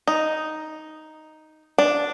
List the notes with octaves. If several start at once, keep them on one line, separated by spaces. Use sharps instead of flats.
D#4
D4